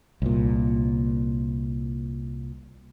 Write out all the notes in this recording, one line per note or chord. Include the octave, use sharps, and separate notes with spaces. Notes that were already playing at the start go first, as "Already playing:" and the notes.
C2 A#2